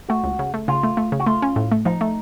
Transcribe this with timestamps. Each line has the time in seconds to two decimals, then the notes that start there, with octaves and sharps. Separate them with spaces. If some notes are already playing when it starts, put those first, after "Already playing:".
0.09 A3 F#4
0.24 C#2
0.39 C#3
0.54 A3
0.68 C#3 F4
0.83 A3
0.97 A3
1.12 C#3
1.20 F#4
1.26 A3 F4
1.42 C#4
1.56 A2
1.72 A3
1.85 F3 D#4
2.01 A3